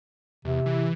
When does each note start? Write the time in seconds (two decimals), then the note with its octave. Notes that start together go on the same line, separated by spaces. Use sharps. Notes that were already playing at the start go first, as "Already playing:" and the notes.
0.45 E2 C3
0.66 E3